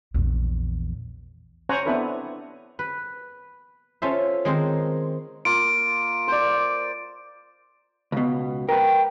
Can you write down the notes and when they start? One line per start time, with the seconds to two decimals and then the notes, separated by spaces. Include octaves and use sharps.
0.14 A#1 E2
1.69 C#4 C5 C#5 F#5 G#5 A#5
1.86 B3 C4 D4 E4 A4 B4
2.79 B4
4.02 C#4 F4 A4 C5 E5
4.45 D#3 G#3 C4 A#4 C5
5.45 A#3 F4 D7
6.28 C5 D5
8.12 C#2 B2
8.69 A#4 B4 G5